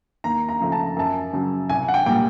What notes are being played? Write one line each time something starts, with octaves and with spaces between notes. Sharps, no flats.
D#2 A#5
A#5
C#3 F3 A3
A5
A#5
F#2 A5
C#3 F#3
C2 G#5
F#5
G5
A#2 G3 G5